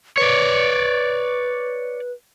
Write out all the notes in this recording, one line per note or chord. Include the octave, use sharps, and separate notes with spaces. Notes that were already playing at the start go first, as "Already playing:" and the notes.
B4 C#5 D5